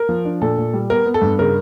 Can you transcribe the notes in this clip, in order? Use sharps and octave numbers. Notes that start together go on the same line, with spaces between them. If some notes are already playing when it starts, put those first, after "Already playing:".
Already playing: A#4
F3
D4
A#2 A4
A#2
G3
B3 A#4
B3
A4
G2
C#3 A#4